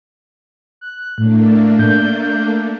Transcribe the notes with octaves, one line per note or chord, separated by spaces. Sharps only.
F#6
A2 A3 A#3 D4
G6